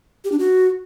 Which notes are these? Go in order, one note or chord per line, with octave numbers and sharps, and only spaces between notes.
G4
D4
F#4